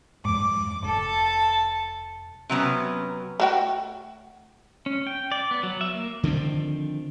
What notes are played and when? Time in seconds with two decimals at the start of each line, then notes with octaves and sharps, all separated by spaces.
0.25 F2 G#2 D6
0.83 F1 A4 A5
2.49 C3 F#3 B3 C#4
3.40 A3 F#4 G5
4.86 C#4
5.07 G5
5.32 D5
5.51 B3
5.63 F#3
5.81 E5
5.94 A#3
6.23 D3 D#3 F3 C4